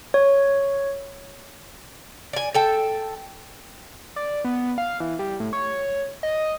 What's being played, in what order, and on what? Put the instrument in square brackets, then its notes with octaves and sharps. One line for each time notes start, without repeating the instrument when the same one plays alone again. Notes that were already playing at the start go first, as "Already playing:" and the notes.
[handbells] C#5
[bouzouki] D5 G#5
A4 G5 A5
[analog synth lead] D5
B3
F5
E3
G3
A2
C#5
D#5